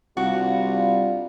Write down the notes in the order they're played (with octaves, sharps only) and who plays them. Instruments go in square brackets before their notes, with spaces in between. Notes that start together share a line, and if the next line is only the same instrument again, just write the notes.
[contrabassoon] C2 [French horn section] G3 D4 F4 [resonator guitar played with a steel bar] F#4